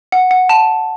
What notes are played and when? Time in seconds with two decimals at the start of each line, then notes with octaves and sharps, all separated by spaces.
0.12 F#5
0.31 F#5
0.49 A5